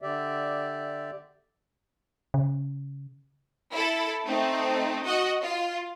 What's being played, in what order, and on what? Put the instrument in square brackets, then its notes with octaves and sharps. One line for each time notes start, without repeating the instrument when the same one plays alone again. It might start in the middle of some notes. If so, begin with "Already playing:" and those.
[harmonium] D3 G4 D5 E5
[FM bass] C#3
[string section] E4 A4
A3 C4 D#4
F#4 D#5 F#5
F4